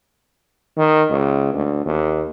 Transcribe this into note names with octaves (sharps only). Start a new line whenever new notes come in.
D#3
C#2
D2
D#2